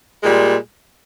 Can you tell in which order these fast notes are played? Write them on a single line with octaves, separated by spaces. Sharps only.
G#3 A#2 G3